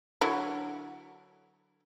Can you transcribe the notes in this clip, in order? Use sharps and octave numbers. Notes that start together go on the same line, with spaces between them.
D3 F#3 E4